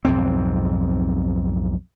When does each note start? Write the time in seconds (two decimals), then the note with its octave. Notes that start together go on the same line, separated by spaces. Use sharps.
0.05 B1 F2 G#2 C4